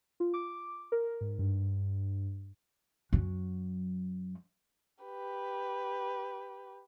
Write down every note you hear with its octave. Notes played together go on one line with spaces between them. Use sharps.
F4
D6
A#4
G#2
G2
F#2 F#3
G4 B4